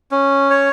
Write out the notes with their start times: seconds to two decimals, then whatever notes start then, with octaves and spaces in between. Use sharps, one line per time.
0.11 C#4
0.50 C#5